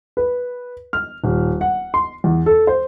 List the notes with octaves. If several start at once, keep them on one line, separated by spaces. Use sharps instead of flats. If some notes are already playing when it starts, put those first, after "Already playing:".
B4
F6
D#1
F#5
C6
E2
A4
C5